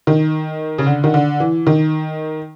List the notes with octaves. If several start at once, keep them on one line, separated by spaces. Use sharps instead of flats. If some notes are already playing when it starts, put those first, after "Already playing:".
D#3
C#3
D3
D#3
D3
E3
D#3